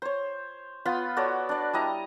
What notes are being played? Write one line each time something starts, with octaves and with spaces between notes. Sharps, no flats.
C5 C#5
B3 F4 B5 C6
F#4 A4 C#5 D5
D4 D5
G3 E4 D#5 A#5